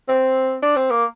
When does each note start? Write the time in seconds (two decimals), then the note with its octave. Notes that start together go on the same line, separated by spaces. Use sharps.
0.08 C4
0.62 D4
0.76 C4
0.90 A#3